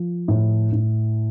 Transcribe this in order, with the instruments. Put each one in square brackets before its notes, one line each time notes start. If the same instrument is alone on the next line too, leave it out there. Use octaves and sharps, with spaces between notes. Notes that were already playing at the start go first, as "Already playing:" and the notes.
Already playing: [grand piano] F3
A2
A2